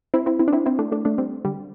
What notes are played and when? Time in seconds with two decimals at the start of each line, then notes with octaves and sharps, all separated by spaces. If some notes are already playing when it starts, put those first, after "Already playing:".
0.14 C4 E4
0.26 C4 E4
0.39 C4 E4
0.48 D4
0.53 C4 E4
0.66 C4 E4
0.79 A3 D4
0.92 A3 D4
1.05 A3 D4
1.18 G3 C4
1.45 D3 G3